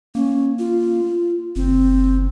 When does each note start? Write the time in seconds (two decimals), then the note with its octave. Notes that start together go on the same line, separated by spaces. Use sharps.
0.15 A#3 C#4
0.59 F4
1.56 F#1 C4